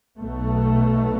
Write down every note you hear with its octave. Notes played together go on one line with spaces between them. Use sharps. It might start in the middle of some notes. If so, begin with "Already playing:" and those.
B1 B2 A3